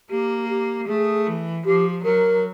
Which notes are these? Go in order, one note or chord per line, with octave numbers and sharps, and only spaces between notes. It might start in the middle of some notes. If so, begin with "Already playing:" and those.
A#3 G4
G4
A3 G#4
E3
F3 G4
F#3 A#4